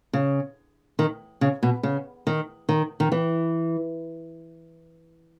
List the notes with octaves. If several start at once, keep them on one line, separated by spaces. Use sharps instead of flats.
C#3
D#3
C#3
B2
C#3
D#3
D#3
D#3
E3